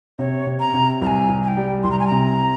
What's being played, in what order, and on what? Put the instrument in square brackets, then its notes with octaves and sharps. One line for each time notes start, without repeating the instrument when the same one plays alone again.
[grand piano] C3 [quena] C#5
[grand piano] C3
[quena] A#5
[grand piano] C3
[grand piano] C2 [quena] A#5
[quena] G#5
[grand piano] C2
[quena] G#5
G5
[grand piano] G3
[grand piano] C2 [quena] C6
[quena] A#5
G#5
[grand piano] C3 [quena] A#5